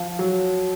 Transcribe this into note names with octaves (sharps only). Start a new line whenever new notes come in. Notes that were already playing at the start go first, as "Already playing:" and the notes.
Already playing: F3 F5
F#3